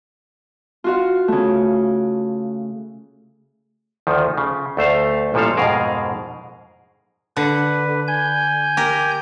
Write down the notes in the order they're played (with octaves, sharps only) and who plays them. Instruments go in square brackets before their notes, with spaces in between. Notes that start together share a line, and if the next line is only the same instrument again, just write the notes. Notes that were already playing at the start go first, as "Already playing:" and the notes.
[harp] F4 F#4 F5
C#3 A3
[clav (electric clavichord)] D2 D#3 F3
C#3
D2 A3 C5 F5
A1 A#2 F3 G3 A4 F5
F2 G#2 B2 G#4 A#4 F5
[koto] D3 [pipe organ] B4
[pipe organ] G#5 G6
[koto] G4 A#4